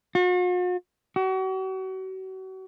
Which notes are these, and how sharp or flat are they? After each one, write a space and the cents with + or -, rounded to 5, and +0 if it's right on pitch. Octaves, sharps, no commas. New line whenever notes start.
F#4 -45
F#4 +40